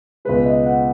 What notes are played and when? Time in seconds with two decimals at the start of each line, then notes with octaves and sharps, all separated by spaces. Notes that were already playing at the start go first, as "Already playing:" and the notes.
0.25 C#2 B2 G#3 B4
0.45 D#5
0.66 F#5